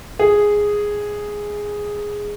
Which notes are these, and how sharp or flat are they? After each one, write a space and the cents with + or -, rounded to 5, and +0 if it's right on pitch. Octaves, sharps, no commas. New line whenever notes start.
G#4 -5